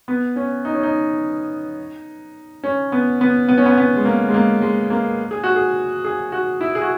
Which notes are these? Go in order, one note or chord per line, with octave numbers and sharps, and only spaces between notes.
B3
C#4
D#4
C#4
D#4
C#4
B3
B3
B3
C#4
B3
B3
G#3
A#3
G#3
A#3
G#3
A#3
G#4
F#4
G#4
G#4
F#4
E4
G#4
F#4